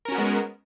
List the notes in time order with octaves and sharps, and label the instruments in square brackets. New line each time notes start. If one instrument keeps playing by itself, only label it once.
[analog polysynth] A#4
C#4
F#4
B3
G#3